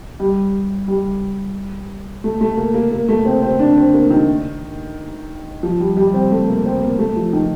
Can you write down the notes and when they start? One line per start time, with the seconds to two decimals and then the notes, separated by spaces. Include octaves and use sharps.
0.20 G3
0.88 G3
2.24 A3
2.41 A3
2.57 A#3
2.74 A#3
2.91 A#3
3.09 A3
3.25 C4
3.42 C4
3.59 D4
3.77 C4
3.93 A#3
4.10 D#3
5.63 F3
5.80 G3
5.97 G3
6.14 C4
6.31 A3
6.48 A#3
6.65 C4
6.82 A#3
6.99 A3
7.16 F3
7.33 D#3